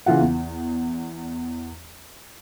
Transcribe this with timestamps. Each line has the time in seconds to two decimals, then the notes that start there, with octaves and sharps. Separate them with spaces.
0.06 C#3 E3 F4 F#5
0.21 E2